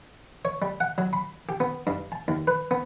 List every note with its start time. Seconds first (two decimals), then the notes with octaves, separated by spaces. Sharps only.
0.45 C#5
0.62 G3
0.80 F#5
0.98 F#3
1.13 B5
1.49 G4
1.60 B3
1.87 G2
2.12 A5
2.28 D#2
2.47 B4
2.71 B3